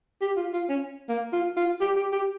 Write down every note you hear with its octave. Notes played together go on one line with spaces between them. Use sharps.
G4
F4
F4
C#4
A#3
F4
F4
G4
G4
G4